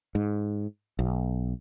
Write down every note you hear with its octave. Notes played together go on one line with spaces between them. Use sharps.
G#2
B1